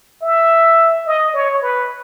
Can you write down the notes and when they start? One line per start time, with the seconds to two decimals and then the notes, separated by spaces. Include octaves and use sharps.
0.22 E5
1.07 D#5
1.34 C#5
1.62 B4